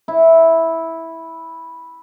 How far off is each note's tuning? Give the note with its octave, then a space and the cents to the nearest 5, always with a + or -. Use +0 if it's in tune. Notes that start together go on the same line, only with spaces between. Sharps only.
E4 -10